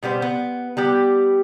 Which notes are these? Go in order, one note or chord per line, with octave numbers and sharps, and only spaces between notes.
B2 G3 B3 C5
B3
G3 B3 G4